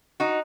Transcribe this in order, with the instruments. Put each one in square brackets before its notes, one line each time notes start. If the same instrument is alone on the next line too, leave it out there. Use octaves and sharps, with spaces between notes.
[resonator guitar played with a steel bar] D#4 F#4